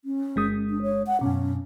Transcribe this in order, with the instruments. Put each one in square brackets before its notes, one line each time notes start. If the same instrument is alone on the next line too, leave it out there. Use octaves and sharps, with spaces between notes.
[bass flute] C#4
[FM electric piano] G1 G#3 D#6
[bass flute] D4
C#5
F#5
[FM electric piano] F#2 B2 [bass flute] C#4